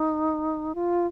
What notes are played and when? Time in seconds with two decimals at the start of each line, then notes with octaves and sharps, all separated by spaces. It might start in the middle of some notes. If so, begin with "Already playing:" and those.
Already playing: D#4
0.75 F4